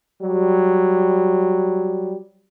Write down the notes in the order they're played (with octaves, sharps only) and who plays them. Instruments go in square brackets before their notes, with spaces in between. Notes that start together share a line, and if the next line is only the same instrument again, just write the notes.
[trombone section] F#3 G3